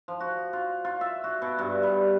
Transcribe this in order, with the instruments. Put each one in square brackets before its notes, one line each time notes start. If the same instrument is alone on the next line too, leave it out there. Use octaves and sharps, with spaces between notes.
[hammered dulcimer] F3
F#4
F4
F4
E5
F#4
B2
G2
G3